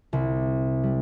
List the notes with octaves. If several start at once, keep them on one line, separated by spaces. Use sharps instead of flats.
C2
G3